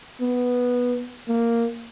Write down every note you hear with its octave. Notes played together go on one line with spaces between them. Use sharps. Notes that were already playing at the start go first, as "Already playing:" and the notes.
B3
A#3